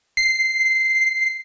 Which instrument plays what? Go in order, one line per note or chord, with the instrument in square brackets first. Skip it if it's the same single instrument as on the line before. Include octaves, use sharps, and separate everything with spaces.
[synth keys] C7